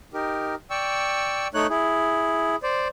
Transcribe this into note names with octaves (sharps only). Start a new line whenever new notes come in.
D#4 G4 A#4
D5 G5 C#6 E6
A3 D#4 C#5 F#6
E4 G#4
C5 D5